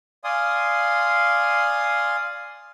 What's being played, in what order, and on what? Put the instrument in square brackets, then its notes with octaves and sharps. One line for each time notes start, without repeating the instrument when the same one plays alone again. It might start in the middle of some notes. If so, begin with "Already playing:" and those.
[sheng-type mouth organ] D5 F5 G#5 C6 D#6